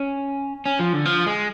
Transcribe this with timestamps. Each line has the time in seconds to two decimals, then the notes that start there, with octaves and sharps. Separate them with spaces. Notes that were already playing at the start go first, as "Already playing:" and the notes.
Already playing: C#4
0.66 C#4
0.79 F3
0.93 D3
1.05 F3
1.26 G#3